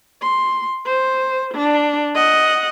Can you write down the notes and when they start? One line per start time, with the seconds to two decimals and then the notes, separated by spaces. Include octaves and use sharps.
0.22 C6
0.86 C5
1.54 D4
2.15 D#5 F#5